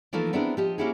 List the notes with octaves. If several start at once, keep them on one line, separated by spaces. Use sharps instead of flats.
E3 F3 A3 A#3 D#4 F4
B3 C4 D4 E4 G#4 A#4
F3 G4 D#5
A#3 C#4 D4 E4 F#4 G#4